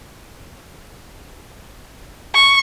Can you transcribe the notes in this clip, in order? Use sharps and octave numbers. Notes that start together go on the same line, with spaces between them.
C#6